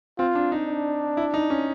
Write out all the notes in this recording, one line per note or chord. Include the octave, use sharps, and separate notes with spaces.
C4 F4
D4
D#4
D4
E4
D#4
C#4